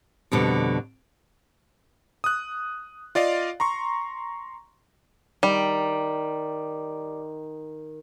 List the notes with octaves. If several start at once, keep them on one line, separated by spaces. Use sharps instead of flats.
F2 B2 D3 G3
D#6 F#6
F4 D5 D#5 F5
A#5 C6 C#6
D#3 G3